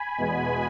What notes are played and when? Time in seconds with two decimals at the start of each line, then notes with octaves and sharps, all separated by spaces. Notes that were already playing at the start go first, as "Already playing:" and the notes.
Already playing: G#5 B5
0.18 E2 B2 G#3 B3